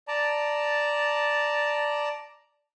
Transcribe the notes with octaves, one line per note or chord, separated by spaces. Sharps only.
D5 A5 A#5